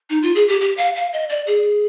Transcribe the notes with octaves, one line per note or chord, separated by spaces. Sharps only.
D#4
F4
G#4
G4
G4
F5
F5
D#5
D5
G#4